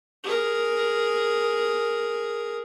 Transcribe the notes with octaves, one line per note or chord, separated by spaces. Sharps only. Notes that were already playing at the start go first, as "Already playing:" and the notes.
G#4 A#4